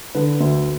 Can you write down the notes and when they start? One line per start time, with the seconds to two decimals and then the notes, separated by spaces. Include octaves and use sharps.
0.15 D3 B4
0.40 D2